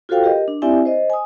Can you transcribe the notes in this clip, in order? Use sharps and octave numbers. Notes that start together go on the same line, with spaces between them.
F4 F#4 A4 C5 F5 G5
G4 A#4 D#5
D4
C4 E4 G4 D5 E5 G#5
C5 D#5
G#5 D#6